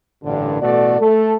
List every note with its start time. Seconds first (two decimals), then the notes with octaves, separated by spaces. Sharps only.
0.24 A1 G2 A#2 D3
0.61 A1 B2 A3 F#4 A4 D5
1.00 A3 A4